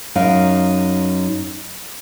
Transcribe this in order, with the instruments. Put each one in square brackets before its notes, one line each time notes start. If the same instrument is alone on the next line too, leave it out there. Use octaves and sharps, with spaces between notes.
[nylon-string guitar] F#2 D#4 F5